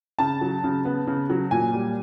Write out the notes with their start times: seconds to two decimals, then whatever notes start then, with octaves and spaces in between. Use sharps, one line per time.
0.19 C#3 A5
0.41 F#3
0.64 C#3
0.85 B3
1.07 C#3
1.30 F#3
1.51 A#2 G#5
1.74 G3